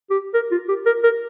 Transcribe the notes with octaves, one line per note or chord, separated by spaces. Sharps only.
G4
A#4
F4
G4
A#4
A#4